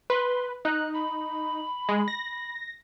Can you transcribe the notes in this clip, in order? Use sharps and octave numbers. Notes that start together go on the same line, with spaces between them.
B4 C6
D#4 F#6
B5
G#3
A#6